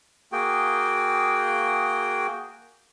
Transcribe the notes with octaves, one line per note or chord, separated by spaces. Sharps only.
A#3 F#4 G#4 G5